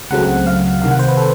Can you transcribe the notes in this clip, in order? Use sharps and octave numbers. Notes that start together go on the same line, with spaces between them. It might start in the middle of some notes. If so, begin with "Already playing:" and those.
C#2 C#3 F#3 A3 C4 F#5
F5
C2 C3 D#3 F5
F#5
C5
B4
A4